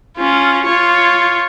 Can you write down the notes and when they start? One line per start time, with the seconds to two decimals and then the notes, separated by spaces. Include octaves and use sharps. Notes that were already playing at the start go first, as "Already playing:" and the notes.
0.17 C#4 F4
0.66 F4 C#5